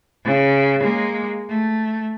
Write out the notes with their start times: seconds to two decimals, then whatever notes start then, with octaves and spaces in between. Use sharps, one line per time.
0.25 C#3
0.81 G#3 A#3
1.49 A3